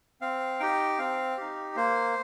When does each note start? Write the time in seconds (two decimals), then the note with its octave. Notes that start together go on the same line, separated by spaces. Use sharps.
0.21 C4 F5
0.60 D#4 G4 G5
0.98 C4 F5
1.38 D#4 G4
1.76 A#3 C5